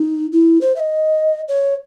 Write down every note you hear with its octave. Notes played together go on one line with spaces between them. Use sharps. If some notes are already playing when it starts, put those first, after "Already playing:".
Already playing: D#4
E4
C5
E5
D#5
C#5